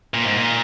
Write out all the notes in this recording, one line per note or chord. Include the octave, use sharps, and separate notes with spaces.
A#2
G#2
A#2